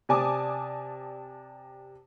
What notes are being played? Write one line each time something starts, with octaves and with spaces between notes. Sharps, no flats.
C3 D5 G#5 A5 D6 D#6